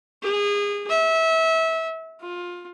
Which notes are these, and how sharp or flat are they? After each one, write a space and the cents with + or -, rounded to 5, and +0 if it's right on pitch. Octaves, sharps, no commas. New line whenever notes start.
G#4 -25
E5 -25
F4 +20